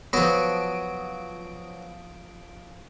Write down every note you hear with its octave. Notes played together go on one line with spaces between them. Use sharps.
F3 F#3 B3 F#4 D#6 D7